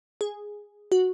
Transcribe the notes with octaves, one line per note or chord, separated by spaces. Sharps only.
G#4
F#4